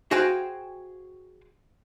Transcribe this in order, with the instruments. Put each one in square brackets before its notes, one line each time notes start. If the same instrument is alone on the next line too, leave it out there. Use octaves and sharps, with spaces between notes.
[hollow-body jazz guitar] F#4 G#4 C5 F5 G5 G#5